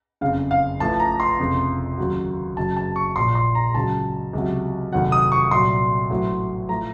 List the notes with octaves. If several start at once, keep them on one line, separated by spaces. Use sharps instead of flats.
F#1 F2 C#3 F5
F5
A1 A2 F3 A5
A#5
C6
F1 F2 C#3 F3
D#2 C#3 F#3
F#1 F#2 C#3 F#3 A5
A5
C#6
A#1 A#2 F3 C6
C6
A#5
C#2 C#3 F#3 A5
C#2 C3 F#3
F1 D#2 D#3 F#3 F#5
D#6
C#6
C2 A#2 F#3 C6
A1 A2 F#3
A2 F3 A#5